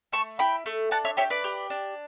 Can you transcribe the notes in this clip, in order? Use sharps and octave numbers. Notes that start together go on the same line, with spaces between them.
A3 A5 C#6
E4 G5 B5
A3
D4 F#5 A5
C#5 E5
G4 C#5 E5
B4 D5
G4
D4